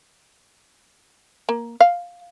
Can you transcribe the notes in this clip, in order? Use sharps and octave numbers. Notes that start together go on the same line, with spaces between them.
A#3
F5